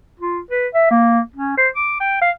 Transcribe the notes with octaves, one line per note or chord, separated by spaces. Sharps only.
F4
B4
E5
A#3
C#4
C5
D6
G5
F5